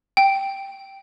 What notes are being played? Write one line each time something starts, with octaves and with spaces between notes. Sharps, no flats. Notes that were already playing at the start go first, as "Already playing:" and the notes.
G5